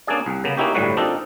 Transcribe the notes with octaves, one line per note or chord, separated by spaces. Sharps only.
A#3 C#4 D4 G#4 D5
C2
C#3 A#3 B3
A#3 C#4 D#4 E4 F#4 G4
G1 A2 F#3 G3 F#4 B4
C4 D4 D#4 F4 A4 A#4